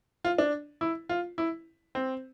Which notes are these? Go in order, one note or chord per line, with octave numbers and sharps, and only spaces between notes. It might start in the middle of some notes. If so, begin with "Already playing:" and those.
F4
D4
E4
F4
E4
C4